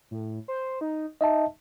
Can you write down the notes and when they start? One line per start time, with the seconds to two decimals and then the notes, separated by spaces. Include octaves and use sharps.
0.11 A2
0.48 C5
0.81 D#4
1.21 D#4 D#5 E5 A5